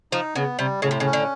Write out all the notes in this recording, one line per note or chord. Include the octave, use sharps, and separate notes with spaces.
F3 D#4
C#3 B3
C3 G3
A2 C#3
C3
C#3
C#4
D3